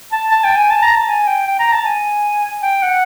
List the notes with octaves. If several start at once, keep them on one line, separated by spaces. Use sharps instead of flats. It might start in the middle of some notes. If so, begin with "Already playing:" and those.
A5
A5
G5
G#5
A5
A#5
A5
G#5
G5
G5
A#5
A5
G#5
G5
F#5